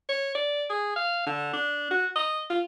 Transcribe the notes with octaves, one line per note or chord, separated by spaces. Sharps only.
C#5
D5
G#4
F5
D3
D4
F#4
D#5
F4